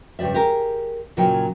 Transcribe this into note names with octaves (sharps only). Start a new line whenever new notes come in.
G2 C#3 G4 D5 E5
G4 G#4 A#4
A#2 C#3 F#3 D#4 F4 G5